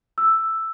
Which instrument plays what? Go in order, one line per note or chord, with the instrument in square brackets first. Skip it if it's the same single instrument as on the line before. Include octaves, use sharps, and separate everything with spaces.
[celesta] E6